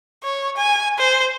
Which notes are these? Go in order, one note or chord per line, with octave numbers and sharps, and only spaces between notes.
C#5
G#5
C5